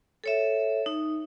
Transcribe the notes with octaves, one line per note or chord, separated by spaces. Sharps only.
A4 C#5 E5
D#4